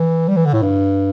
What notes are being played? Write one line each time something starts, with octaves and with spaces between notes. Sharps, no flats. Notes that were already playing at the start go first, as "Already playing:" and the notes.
Already playing: E3
G3
E3
D3
A2
G2